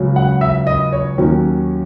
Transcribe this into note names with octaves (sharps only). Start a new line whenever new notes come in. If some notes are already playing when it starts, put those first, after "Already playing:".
Already playing: C#2 C#3 F#3 C#4
F#5
E5
D#5
C#5
D#2 D#3 F#3 C#4